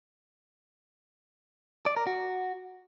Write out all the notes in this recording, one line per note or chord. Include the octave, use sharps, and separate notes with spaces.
D5
A#4
F#4